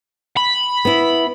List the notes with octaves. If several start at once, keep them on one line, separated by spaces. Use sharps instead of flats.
B5
B3 E4